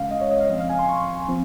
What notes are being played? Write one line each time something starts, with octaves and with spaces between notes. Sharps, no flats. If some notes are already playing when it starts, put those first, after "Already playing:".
Already playing: C#3 G#3 C#4 F5
D#5
C#5
D#5
F5
F3 C4 D#5
F5
G#5
C6
C#6
F3 C4